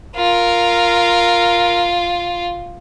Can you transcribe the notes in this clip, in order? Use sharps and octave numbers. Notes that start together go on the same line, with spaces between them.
F4 A#4